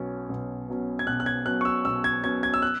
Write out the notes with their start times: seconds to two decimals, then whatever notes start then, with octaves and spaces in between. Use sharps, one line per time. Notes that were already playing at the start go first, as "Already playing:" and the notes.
Already playing: B1 B2 F#3 C#4
0.29 B1
0.68 B2 F#3 C#4
0.99 G#6
1.07 B1 F#6
1.20 F#6
1.26 G#6
1.46 B2 F#3 C#4 F#6
1.61 C#6
1.65 E6
1.85 B1 E6
2.04 G#6
2.24 B2 F#3 C#4 G#6
2.43 G#6
2.54 E6
2.62 F#6